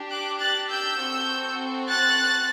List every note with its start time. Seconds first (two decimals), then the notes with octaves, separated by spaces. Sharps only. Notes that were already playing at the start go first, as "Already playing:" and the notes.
Already playing: D4 G4
0.10 D6 F#6
0.39 F#6 A6
0.69 E6 G6
0.99 C4 F#4 A4
1.88 F#6 A6